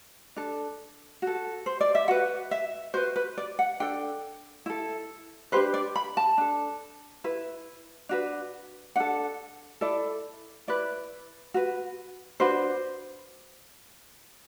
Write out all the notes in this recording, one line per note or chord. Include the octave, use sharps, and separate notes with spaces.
D4 A4
F#4 A4
C5
D5
E5
F#4 B4 F#5
E5
F#4 B4 C5
B4
D5
F#5
D4 A4 G5
E4 A4
D4 G4 B4 C5
D5
B5
A5
D4 A4
E4 B4
D4 F#4 B4
D4 A4 F#5
E4 A4 D5
E4 B4 D5
F#4 B4
D4 F#4 B4 C5